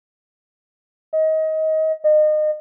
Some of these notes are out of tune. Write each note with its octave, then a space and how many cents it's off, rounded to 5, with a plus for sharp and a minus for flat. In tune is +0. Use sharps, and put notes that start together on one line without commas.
D#5 +25
D#5 -30